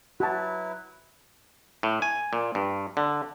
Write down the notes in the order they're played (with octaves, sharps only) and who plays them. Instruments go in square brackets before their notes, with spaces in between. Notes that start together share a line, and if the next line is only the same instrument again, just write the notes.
[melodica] F#3 E4 B4 [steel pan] F#4 A5
[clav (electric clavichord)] A2
G#5
A#2
G2
D3